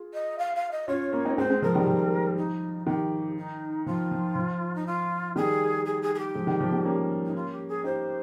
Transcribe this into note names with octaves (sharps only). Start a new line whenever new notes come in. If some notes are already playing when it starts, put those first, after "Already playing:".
Already playing: F4 G#4
D#5
F5
F5
D#5
C#4 F4 C#5
A#3 C#4
C4 D#4
G#3 C4 C5
G#3 C4
F3 G#3 A#4
D#3 G3
F3
D#4
D#3 G4
D#4
F3 F4
F3
F3
D#4
F4
D#3 G3 G#4
G#4
G#4
G#4
G4
F3 G#3
D#3 G3
F3
D#3 G3
A#3 C#4
D#4
F4
G4
G#4
D#4 G4 C5